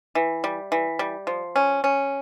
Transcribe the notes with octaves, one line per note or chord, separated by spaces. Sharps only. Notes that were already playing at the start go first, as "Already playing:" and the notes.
E3
G3
E3
G3
F3
C#4
C#4